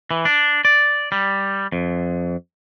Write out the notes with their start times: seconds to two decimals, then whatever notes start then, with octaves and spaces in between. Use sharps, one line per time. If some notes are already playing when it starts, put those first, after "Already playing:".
0.11 E3
0.25 D4
0.65 D5
1.12 G3
1.72 F2